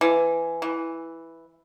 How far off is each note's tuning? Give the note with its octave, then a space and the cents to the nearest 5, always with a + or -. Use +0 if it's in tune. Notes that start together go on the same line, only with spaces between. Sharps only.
E3 +20
E3 +0